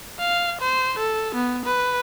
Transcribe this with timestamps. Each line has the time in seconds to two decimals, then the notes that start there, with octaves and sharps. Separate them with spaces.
0.20 F5
0.61 C5
0.99 A4
1.35 B3
1.65 B4